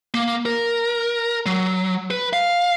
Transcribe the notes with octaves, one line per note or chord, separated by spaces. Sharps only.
A#3
A#4
F#3
B4
F5